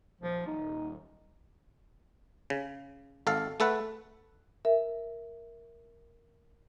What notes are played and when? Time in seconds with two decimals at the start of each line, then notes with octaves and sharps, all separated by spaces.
0.21 D#1 F3
0.47 D#4
2.50 C#3
3.27 G#1 A4 F5
3.60 A3 A4 B4 F#5
4.65 A#4 E5